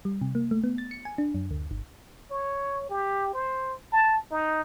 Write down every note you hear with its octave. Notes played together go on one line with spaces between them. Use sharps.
G3
C3
A#3
A3
B3
A6
C#7
G#5
D4
F#2
D2
G1
C#5
G4
C5
A5
D#4